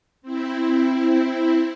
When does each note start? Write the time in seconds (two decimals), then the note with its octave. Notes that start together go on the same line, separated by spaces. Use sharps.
0.22 C4 E4